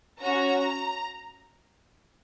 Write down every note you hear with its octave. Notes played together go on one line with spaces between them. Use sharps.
C#4 F#4 A#5